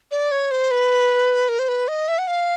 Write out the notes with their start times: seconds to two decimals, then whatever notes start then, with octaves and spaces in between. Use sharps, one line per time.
0.11 D5
0.32 C#5
0.51 C5
0.71 B4
1.49 A#4
1.59 C5
1.68 B4
1.88 D#5
2.08 E5
2.18 F#5
2.27 F5